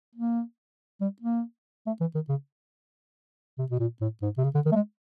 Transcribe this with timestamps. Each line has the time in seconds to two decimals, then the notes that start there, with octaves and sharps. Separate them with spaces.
0.16 A#3
1.01 G3
1.22 A#3
1.87 A3
2.01 E3
2.15 D#3
2.29 C#3
3.58 C3
3.71 B2
3.80 A#2
4.01 A2
4.22 G#2
4.38 C3
4.44 C#3
4.55 D3
4.66 D#3
4.72 A3
4.76 G#3